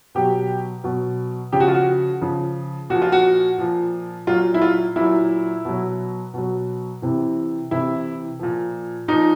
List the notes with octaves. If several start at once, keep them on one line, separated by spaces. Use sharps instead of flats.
B2 F#3 G4
B2 F#3
C#3 F3 G4
F#4
F4
F#4
C#3 F3
A#2 F3 F#4
F4
F#4
A#2 F3
A#2 F#3 F4
E4
F4
A#2 F#3 E4
B2 F#3
B2 F#3
C3 E3
C3 E3 E4
A#2 F3
A#2 F3 D#4